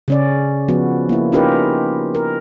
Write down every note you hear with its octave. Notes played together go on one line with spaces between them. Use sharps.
C#3 C#4 D5
F3 B3 F#4
A#3 E4
C#4 D#4 F4 G4 A#4 B4
A#4